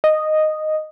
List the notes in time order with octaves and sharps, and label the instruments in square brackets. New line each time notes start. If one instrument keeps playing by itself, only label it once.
[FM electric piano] D#5